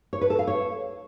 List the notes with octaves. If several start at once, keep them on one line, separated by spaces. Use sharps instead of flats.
C#5
B4
A4
F5
C#5